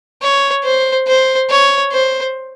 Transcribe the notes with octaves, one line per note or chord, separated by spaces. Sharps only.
C#5
C5
C5
C#5
C5